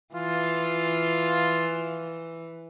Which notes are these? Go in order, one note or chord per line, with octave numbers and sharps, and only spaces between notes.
E3 F4